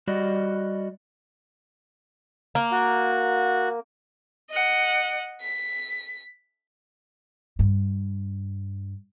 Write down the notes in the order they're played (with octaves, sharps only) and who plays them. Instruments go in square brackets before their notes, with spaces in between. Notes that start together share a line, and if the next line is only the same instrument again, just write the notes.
[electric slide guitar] G3 F#4 D5 D#5
[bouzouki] A#3
[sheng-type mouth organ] F#4
[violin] D#5 F#5
B6
[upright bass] G2